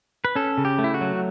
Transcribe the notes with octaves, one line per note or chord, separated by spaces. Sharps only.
B4
C#4 A4
C#3
G4
A3
E4
F#4
F#3